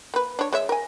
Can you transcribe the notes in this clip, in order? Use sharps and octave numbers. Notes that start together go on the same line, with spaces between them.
A#3 B4
D4 C#5
G#3 C#5 E5
A#4 G#5